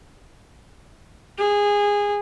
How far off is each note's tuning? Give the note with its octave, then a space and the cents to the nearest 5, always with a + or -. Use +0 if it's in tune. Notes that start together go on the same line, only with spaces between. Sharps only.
G#4 -20